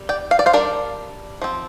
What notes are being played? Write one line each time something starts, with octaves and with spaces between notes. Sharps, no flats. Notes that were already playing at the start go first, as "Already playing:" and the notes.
Already playing: G3
D5 G5
F5
D5
C5 F5
G3 D4 A#4 D5
F3 C4